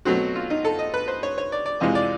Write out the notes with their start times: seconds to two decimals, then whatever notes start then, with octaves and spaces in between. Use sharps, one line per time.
0.05 B2 F#3 A3 C4 F#4
0.36 F4
0.50 D#4
0.65 A4
0.79 D#5
0.94 B4
1.08 C5
1.23 C#5
1.38 C#5
1.52 D5
1.66 D5
1.80 F2 C3 E3 G#3 D#5
1.95 D5